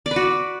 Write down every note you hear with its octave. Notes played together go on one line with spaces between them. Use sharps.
D5
B4
F#4